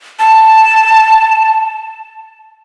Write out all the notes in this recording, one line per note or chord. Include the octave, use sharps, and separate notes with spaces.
A5